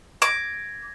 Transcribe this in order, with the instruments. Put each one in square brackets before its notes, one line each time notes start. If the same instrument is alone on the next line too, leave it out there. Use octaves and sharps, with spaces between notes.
[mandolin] D6 [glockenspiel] G#6 A#6